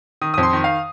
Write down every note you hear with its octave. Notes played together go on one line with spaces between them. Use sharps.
D#3 D#6
F2 D#6
C6
D#3
F5